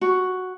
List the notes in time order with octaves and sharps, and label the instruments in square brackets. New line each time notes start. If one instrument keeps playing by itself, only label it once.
[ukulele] F#4